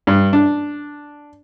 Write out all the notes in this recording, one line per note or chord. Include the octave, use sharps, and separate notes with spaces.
G2
D4